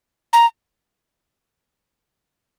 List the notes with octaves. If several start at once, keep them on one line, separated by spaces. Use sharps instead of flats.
A#5